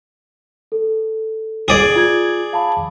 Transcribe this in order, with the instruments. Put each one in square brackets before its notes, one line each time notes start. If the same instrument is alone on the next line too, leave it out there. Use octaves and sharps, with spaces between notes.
[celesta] A4
[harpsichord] G#4 D5
[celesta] F4 G#6
F5 A5 B5